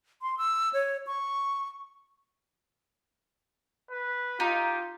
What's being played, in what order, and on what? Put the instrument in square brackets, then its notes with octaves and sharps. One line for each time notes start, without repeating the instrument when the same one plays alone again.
[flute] C6
E6
C#5
C#6
[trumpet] B4
[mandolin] D#4 [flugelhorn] F4 [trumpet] G4